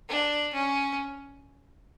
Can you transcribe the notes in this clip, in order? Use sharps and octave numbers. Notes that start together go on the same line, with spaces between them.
D4
C#4